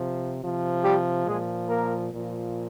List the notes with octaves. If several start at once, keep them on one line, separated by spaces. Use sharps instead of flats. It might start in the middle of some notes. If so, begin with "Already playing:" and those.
Already playing: C3 F3
C3 F3
G3 G4
A#2 F3 G#3 G#4
A#3 A#4
A#2 F3